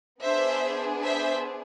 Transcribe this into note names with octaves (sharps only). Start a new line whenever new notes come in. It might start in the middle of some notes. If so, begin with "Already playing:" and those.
B3 D4 G#4 C5 E5
C5 E5